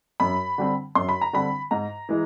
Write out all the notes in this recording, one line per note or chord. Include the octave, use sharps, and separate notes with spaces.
F#2 B5
D3 G3 C4
F#2 C6
B5
A#5
D3 G3 C4 B5
G#2 A#5
E3 G#3